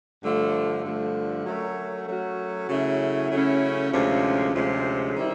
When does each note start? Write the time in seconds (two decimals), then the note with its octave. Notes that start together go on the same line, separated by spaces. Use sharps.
0.23 G2 D3 F3 A3
0.84 G2 D3 F3 A3
1.46 F#3 A3 C#4 F#4 A#4
2.08 F#3 A3 C#4 F#4 A#4
2.69 C#3 F#3 A3 C#4 E4
3.31 C#3 F#3 A3 C#4 E4
3.93 D2 C3 F3 G#3 C#4
4.54 D2 C3 F3 G#3 C#4
5.16 D#3 G3 C4 E4